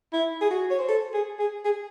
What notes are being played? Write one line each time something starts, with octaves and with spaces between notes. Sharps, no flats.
E4
G#4
F#4
C#5
C5
A4
G#4
G#4
G#4